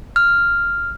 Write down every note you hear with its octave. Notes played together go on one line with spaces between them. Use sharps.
F6